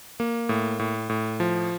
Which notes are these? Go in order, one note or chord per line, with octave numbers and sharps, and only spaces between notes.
A#3
A2
A2
A2
F3